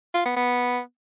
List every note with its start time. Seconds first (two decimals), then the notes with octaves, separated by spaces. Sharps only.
0.14 F4
0.25 B3
0.36 B3